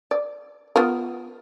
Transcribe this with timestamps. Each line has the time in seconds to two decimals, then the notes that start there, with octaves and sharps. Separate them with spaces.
0.11 D5
0.76 B3 F4 A#4